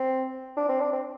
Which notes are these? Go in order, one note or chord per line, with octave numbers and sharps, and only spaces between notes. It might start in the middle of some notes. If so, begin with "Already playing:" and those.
Already playing: C4
D4
C4
D4
C4